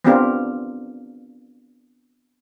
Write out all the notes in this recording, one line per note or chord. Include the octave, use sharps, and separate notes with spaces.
B3 C4 D4 F4 G4 A#4